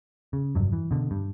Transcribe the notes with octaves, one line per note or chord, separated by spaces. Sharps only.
C#3
F1 G2 F#3
E3
B2 D3
G2